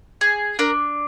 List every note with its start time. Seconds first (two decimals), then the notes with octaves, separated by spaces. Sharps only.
0.21 G#4
0.59 D4 A#4